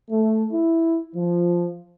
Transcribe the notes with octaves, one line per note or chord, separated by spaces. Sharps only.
A3
E4
F3